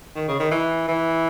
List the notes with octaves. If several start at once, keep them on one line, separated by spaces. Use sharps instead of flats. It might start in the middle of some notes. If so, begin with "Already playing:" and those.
D#3
C#3
D#3
E3
E3